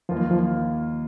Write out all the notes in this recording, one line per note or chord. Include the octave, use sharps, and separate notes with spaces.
D#2 D#3 F3 A#3 F4
F3